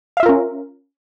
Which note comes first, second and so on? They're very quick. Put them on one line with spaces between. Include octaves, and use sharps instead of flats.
F5 E5 F4 A#4 C#4